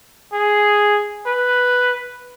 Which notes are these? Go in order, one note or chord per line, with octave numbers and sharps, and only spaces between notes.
G#4
B4